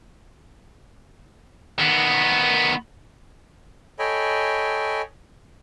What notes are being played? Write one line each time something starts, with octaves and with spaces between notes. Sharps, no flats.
D#3 B3
A4 C#5 D#5 G5 G#5 B5